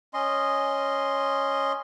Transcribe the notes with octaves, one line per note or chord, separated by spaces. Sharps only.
C#4 D#5 C6